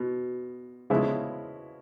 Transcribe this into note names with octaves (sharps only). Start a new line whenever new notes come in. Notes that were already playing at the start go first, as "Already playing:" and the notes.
Already playing: B2
C#3 F3 G#3 B3 E4